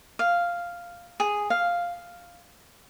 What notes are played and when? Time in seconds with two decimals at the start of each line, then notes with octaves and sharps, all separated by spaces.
0.19 F5
1.20 G#4
1.50 F5